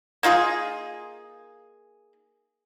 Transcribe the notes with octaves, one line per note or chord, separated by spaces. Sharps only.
A#3 D#4 F4 G#4